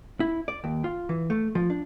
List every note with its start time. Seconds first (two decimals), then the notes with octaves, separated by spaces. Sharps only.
0.20 E4
0.48 D5
0.64 D#2
0.84 F4
1.09 E3
1.30 A3
1.55 F3
1.70 D4